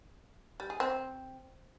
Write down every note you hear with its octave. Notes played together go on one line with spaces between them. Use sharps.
G3
G#4
C4